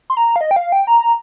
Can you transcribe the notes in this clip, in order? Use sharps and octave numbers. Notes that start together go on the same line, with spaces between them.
C6
A#5
F5
D#5
G5
F5
G5
A#5